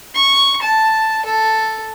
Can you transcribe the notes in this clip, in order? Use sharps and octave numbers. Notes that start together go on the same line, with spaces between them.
C#6
A5
A4